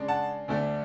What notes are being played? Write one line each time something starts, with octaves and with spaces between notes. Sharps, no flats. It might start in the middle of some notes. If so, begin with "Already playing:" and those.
Already playing: C#3 G#3 D4
F#5 A5
D2 D3 A3 D4